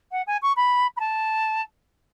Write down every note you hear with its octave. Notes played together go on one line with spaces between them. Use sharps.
F#5
G#5
C#6
B5
B5
A5